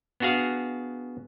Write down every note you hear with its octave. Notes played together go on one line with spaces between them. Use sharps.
B3 D4 F#4 G#4 F5